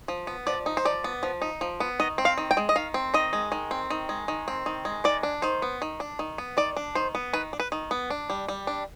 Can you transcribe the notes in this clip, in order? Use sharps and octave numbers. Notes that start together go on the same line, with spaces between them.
F3
B3
F3 D5
D#4
C5
F3 D5
B3
F3
D#4
F3
B3
D#3 D#5
C4
F5
D#3
G5
G#3
D#5
D#3 F5
C4
D#3 D#5
G#3
D#3
C4
D#3
G#3
D#3
C4
D#3
G#3
D#3 D5
D4
D#3 C5
B3
D#3
D4
D#3
B3
D#3 D5
D4
D#3 C5
B3
D#3 B4
D4
B4
D#3
B3
D4
G3
G3
D4